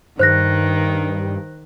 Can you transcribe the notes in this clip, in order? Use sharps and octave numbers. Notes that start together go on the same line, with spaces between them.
G2 D#3 C5 F#6 A#6